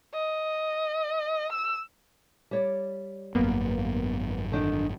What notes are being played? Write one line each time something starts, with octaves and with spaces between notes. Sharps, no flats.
D#5
E6
G3 C#5 D5
G#1 F#2 A#3 B3
D3 D#3 D4